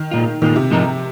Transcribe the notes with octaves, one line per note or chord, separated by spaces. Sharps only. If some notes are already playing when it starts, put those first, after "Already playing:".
Already playing: D#3
A#2 G#3 F4
A#2 D#3 G#3 F4
C3
G#2 F3 G#3 D#4 A#4